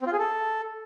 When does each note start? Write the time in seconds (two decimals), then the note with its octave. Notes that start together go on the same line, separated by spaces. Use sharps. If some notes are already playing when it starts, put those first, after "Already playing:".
0.01 C4
0.07 F4
0.13 G#4
0.19 A4